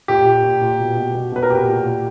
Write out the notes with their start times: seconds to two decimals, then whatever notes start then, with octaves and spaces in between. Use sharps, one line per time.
0.08 A#2 G4
0.26 A#2
0.43 A#2
0.62 A#2
0.80 B2
0.97 B2
1.15 B2
1.32 B2 B4
1.43 A#4
1.50 A#2 G4
1.68 A#2
1.86 A#2